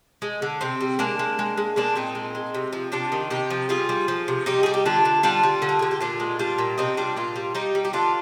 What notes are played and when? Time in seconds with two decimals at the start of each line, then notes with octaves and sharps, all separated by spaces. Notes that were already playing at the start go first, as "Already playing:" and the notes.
0.22 G#3
0.42 D3
0.61 C3 C4
0.81 G3
0.99 G#3 A#3 D4
1.19 G#3
1.39 G#3
1.57 G#3
1.76 G#3 A#3 D4
1.95 A#2 C4 D#4
2.15 G#3
2.35 G#3
2.54 C3
2.73 F3
2.92 C3 D4 F4
3.12 D#3
3.30 C3 D#4 G4
3.50 F3
3.69 G3 F4 G#4
3.89 G3
4.08 F3
4.28 C3
4.46 G3 D#4 G4
4.63 G3 G#4
4.74 G4
4.86 D3 D4 F4
5.05 D3
5.23 G3 D4 F4
5.43 G3
5.62 D3
5.69 A#4
5.79 D3 G#4
5.91 G4
6.00 A#2 D4 F4
6.20 G#3
6.39 G3 D4 F4
6.58 A#2
6.78 C3 C4 D#4
6.97 G3 D4 F4
7.17 A#2 D4 F4
7.36 G3
7.55 G3 D#4 G4
7.75 G3
7.85 G4
7.93 D3 D4 F4